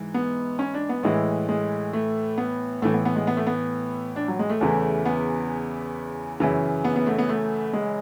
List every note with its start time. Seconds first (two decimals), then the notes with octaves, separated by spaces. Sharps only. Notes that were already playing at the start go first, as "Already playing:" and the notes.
Already playing: G#2 E3
0.14 B3
0.59 C#4
0.74 D4
0.89 B3
1.03 A2 E3 G#3
1.49 G#3
1.93 A3
2.38 B3
2.82 A2 E3 A3
2.93 B3
3.05 B3
3.16 G#3
3.27 B3
3.37 A3
3.47 B3
4.16 D4
4.28 F#3
4.39 G#3
4.49 A3
4.61 E2 C#3 E3
5.05 B3
6.40 F#2 C#3 E3
6.84 B3
6.96 B3
7.07 A3
7.18 B3
7.29 A3
7.73 G#3